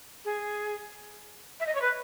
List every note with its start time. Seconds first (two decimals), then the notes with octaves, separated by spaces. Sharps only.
0.25 G#4
1.60 E5
1.66 D#5
1.75 C#5
1.81 B4